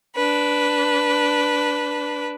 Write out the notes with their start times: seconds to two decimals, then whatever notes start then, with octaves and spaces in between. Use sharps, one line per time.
0.16 D4 B4